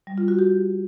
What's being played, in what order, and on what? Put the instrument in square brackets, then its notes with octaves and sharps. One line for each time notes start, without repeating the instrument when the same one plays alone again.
[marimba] G3
F4
F#4
G4